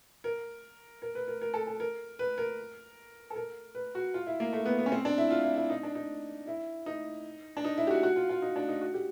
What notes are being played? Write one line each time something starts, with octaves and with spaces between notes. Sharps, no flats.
A#4
A#4
B4
A#4
A#4
A4
A4
A#4
B4
A#4
A4
A#4
B4
F#4
F4
E4
A#3
A3
B3
B3
C#4
C4
D4
E4
F4
E4
E4
D#4
D4
D#4
E4
D#4
D4
D#4
E4
G4
F#4
F#4
F4
F4
D#4
D4
D#4
F#4
G4